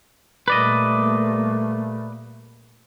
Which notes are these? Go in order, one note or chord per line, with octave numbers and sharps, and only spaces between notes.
A#2 G3 A3 A#3 B4 D5 D#5